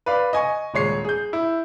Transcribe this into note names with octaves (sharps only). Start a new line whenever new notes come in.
B4 D5 F5
D#5 G#5 C#6
D#1 G#3 C#5 C7
G#4 G6
E4